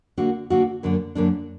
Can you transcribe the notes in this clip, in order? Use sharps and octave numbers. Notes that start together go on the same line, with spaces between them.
D3 A#3 D4 F#4
D3 A#3 D4 F#4
F#2 D3 A#3 D4
F#2 D3 A#3 D4